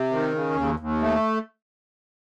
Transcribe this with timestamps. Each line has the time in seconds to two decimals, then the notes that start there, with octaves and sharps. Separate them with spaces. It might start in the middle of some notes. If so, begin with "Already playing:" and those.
Already playing: C3
0.11 D#3
0.33 C#3
0.56 D#2
0.79 D#2
1.01 A3